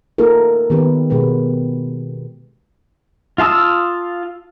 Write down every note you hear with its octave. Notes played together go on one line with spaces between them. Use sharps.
A#3 D#4 F4 A4 A#4
D#3 B3 G4 B4
B2 G#3 G4 B4
F4 F5 A5 D#6 E6